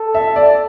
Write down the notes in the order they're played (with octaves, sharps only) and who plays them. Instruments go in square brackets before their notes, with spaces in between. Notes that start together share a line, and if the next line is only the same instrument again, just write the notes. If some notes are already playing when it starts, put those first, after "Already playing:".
Already playing: [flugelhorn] A4
[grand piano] E5
D5